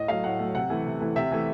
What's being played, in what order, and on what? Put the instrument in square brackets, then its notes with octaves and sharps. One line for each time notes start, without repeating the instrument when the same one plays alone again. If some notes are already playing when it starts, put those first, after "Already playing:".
Already playing: [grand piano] A2 D#5
F#3 A3 F5
A2 F#5
F#3 A3
C3 F#5
E3 A3
C3
E3 A3
C3 E5
E3 A3